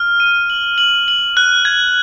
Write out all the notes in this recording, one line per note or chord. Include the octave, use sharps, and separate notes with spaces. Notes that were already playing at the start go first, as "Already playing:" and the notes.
Already playing: F6
D#7
F#7
F#7
F#7
F#6
G#6